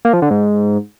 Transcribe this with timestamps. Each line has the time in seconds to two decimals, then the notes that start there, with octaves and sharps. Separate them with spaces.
0.05 A#3
0.13 F3
0.22 D3
0.31 G#2